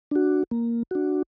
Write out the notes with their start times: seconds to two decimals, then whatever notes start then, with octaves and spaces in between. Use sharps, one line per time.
0.11 D4 F#4
0.51 A#3
0.91 D4 F#4